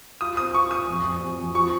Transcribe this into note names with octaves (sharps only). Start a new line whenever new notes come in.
F4 D#6
C4 D#6
F4 C#6
F4 D#6
F2
F2
F2
F2
F3 C#6